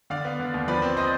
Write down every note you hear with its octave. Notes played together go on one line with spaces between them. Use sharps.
D3 D5 F5
B3
D3
D#2
F3 B4 D5
C4
C5 D#5